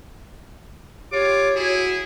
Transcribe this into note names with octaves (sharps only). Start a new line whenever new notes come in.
F4 G4 C#5 D6
E4 F#4 G#4